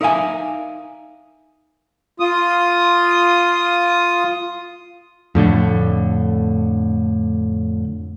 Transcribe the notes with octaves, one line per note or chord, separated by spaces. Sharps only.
D#4 A#4 E5 F5 G#5
F4 D#6
F2 A2 D3 A3